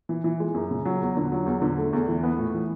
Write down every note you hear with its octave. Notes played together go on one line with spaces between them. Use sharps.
E3
E3
G#3
F#2
C#3
F#3
E2
D3
F#3
E2
D3
A3
E2
E3
B3
A2
E3